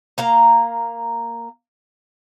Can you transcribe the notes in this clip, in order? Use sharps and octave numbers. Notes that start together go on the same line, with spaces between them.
A#3 F5 A#5